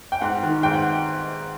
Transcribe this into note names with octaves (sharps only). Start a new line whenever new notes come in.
G5
G#2 F#5
D#3
G#2 G5
F#5